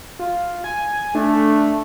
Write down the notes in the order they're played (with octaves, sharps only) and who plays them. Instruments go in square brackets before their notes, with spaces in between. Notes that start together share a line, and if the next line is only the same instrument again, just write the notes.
[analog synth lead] F4
G#5
[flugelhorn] A3 [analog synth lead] D4